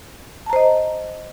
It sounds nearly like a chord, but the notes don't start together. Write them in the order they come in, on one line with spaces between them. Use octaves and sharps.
A5 A#5 C5 D#5